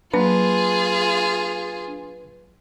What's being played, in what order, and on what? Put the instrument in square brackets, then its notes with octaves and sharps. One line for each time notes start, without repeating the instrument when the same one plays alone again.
[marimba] F#3 A#3 A5 [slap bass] D4 [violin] F4 G#4 [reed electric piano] B4